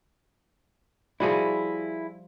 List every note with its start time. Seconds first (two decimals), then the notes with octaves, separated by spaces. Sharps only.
1.20 F3 G3 E4 F#4 G#4